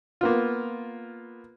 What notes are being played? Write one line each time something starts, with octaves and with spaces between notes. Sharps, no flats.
A#3 B3 F4